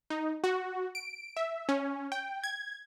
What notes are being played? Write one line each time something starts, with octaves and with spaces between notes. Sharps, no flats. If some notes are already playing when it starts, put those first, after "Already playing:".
D#4
F#4
D7
E5
C#4
G5
G#6